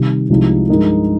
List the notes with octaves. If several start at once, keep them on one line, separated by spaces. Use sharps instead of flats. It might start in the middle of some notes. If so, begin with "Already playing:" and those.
Already playing: C3 D#3 G3
C2 C3 F3 G#3 D#4
G2 F3 G#3 D#4 A#4